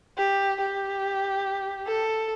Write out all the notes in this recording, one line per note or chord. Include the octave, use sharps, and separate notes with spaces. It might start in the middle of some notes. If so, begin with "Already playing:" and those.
G4
G4
A4